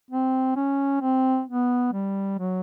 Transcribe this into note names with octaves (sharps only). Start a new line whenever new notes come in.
C4
C#4
C4
B3
G3
F#3